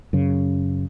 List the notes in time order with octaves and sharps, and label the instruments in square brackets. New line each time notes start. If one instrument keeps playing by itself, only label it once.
[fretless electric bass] F#2 C#3